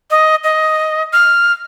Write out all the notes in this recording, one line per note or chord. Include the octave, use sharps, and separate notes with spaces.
D#5
D#5
F6